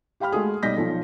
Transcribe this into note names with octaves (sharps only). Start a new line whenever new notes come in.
G4 F5 G5 B5 F6
G#3 A3 F#4 G#4
B1 G3 D#5 G6 A#6 B6
B1 F3 A4